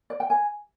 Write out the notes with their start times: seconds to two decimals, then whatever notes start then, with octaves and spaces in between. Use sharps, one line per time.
0.10 D5
0.20 G5
0.30 G#5